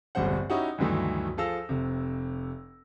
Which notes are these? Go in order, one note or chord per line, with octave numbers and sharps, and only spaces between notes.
D1 A1 G2 B2 C5 F#5
C#4 D#4 E4 F#4 G4 F#5
D2 G2 D#3 E3 F#3 A3
F3 G#4 A4 F5 E6 A#6
F1 C3